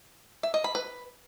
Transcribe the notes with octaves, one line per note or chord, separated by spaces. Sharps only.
E5
D#5
B5
B4